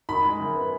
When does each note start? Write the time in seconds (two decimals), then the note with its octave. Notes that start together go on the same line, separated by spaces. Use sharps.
0.09 D#3 B5
0.24 G#3
0.40 F#2
0.56 B3